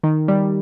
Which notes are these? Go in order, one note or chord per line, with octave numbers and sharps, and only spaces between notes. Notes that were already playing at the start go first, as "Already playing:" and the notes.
D#3
G3